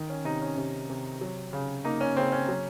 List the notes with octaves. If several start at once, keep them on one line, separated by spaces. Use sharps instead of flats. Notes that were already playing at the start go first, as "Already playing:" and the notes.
Already playing: D#3
C#4
C3 D#4
C#4
C3
C3
F#3
C#3
A#3 D#4
C#4
C#3 C4
C#4
F#3